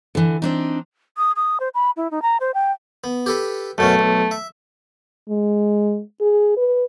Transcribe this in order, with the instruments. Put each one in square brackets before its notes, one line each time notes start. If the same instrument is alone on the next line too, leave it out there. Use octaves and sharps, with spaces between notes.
[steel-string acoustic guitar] D3 E3
C4 D4 D#4
[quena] D#6
D#6
C5
B5
E4
D#4
A#5
C5
G5
[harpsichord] B3
G4 A4 B4
[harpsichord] F#2 B2 C#4 [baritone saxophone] A3
[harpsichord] B1
E5
[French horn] G#3
G#4
B4